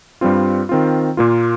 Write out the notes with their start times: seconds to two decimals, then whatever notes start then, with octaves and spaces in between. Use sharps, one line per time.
0.21 G2 G3 C4 F4
0.69 D#3 C4 F4
1.17 A#2 A#3 F4